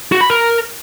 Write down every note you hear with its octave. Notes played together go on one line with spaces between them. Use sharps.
F#4
B5
A#4